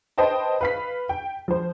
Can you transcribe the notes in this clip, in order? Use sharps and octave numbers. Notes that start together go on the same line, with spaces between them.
B4 C5 D#5 G5 A5
B4 F5 B6
G5
F3 C5